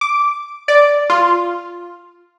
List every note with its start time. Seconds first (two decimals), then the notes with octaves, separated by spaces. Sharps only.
0.01 D6
0.68 D5
1.10 F4